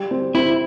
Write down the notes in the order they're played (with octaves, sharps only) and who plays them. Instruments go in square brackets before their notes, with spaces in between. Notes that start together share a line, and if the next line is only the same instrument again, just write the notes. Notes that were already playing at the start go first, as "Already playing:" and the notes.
Already playing: [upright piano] G3
C4
[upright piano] C4 [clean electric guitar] E4